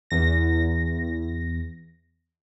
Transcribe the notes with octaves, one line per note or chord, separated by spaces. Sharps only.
E2 A#6